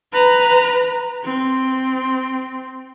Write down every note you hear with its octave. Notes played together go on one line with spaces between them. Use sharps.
B4 A#5
C4